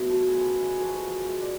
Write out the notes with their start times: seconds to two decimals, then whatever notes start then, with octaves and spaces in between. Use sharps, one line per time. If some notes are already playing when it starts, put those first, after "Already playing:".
Already playing: B2 F#3 A3 B4
0.10 F4 A4 C#5
0.28 G#4 B4
0.33 C#3
0.46 F#4
0.56 G#3
0.62 F4 G#4
0.80 F3 F#4 A4
1.04 F3
1.28 G#3
1.42 D5